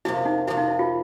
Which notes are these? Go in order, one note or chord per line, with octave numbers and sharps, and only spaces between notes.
F2 C3 F3 A#3 E4
D#4
F2 C3 F3 A#3 E4
D#4
E4
F4